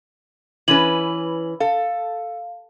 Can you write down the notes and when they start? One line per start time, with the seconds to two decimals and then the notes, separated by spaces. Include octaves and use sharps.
0.68 E3 C#4 B4 F#7
1.60 A4 F5